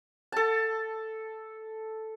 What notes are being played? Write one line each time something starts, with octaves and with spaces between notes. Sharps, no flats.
A4 A5